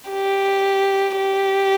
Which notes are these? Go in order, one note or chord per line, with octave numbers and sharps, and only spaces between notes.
G4
G4